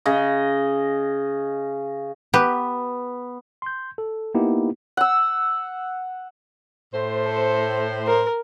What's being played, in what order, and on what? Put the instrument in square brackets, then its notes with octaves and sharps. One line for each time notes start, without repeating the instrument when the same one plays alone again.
[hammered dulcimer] C#3 D#5
[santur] B3 [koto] G4 B4
[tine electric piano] C6 G6
A4
A#3 B3 D#4 E4 G4
[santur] F#5 E6
[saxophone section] A2 C5
[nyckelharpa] A4
A#4